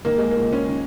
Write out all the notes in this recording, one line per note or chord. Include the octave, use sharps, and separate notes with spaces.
D#3 A#3
G#3
A#3
C#2
C#4
D#3